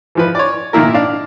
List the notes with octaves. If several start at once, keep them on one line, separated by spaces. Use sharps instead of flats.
E3 F3 B4
C#5 D5
A#2 D#3 A#3 E4 A#4
D4 F5